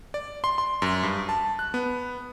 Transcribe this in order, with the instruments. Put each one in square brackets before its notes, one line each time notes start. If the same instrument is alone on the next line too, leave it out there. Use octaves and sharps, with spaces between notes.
[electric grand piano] D5
C6
C6
F#2
G2
A5
F#6
B3